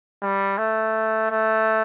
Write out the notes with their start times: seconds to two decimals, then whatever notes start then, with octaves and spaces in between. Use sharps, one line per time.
0.23 G3
0.58 A3
1.31 A3